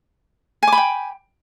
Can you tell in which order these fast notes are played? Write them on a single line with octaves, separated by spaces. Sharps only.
G#5 D6 B5 G5